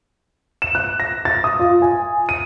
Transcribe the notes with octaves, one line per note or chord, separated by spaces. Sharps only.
E7
F#6
A#6
A6
D#6
F4
G#5
D#7